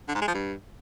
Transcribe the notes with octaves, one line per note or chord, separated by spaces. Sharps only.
D3
G#2
G#3
F3
G2